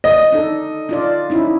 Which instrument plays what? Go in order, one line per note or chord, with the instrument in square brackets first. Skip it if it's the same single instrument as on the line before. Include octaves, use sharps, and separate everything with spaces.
[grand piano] D#5
[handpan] D4 D#4 A4
D4 F4 D5
C#4 D#4 E4